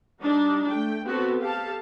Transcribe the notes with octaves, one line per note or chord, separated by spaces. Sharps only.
G3 D4 D#4
A3 G5
B3 C4 F#4 A4
G4 A4 F5 A5